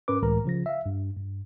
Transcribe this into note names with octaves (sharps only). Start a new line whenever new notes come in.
G#2 C#4 A#4 B4 D6
C#2 A2 E3 G#3 A#4 A#5
C#3 F3 A#6
E5 F5
G2
G2